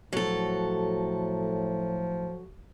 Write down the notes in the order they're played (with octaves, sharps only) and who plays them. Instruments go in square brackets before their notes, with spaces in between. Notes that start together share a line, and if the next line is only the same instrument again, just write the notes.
[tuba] A2 [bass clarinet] F3 [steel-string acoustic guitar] F#3 A4